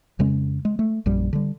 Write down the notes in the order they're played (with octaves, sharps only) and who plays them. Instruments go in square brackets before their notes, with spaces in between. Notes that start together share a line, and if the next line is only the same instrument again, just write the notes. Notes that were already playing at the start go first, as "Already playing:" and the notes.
[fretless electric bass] F2 C#3 G#3 C#4
G#3
A3
A#1 F#2 G3
D3 G3